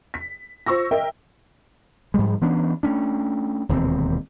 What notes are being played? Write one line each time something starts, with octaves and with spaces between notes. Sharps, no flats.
B6
F4 C5 C#6 E6 A#6
A#4 D#5 E5 G5
G#2 F3 G3 G#3
E3 B3 C#4 D4
A3 C#4 D4
E1 D#2 C3 C4